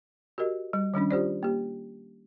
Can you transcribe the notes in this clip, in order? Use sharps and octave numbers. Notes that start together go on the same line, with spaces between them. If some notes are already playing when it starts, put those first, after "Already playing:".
F#4 G4 A#4 D#5
G3
D#3 G3 C#4 D4
F4 G4 C5 D5
A#3 G4